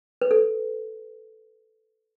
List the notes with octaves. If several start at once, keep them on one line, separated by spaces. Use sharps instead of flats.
B4
A4